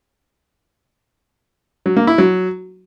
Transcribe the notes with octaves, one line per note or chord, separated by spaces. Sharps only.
F#3
A#3
E4
F#3